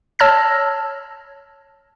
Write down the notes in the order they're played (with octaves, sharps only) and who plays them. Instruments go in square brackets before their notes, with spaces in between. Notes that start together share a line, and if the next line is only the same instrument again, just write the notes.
[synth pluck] C#5 A5 E6 F6 G#6 A#6